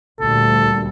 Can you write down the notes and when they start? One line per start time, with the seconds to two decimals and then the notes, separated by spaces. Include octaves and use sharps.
0.20 D2 A#2 G3 A4